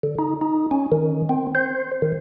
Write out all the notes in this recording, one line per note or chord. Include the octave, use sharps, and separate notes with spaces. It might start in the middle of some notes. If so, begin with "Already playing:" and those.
D3
D#4
D#4
C#4
D#3
C4
C5
D#3